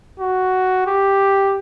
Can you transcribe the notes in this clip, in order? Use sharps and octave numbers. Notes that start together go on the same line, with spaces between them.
F#4
G4